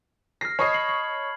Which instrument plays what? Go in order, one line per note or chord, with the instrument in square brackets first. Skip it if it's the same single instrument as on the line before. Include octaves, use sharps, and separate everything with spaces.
[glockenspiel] F6 C7 [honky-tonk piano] A#6
[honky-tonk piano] C#5 D#5 C7 [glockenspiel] A5 B5 G#6
[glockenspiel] F#7
F#7